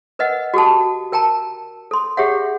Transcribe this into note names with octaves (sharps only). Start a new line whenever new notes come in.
A#4 B4 D#5 F#5
F#4 G4 A4 A5
A#4 G5 A5 A#5
A4 C6
G4 G#4 C#5 E5 F#5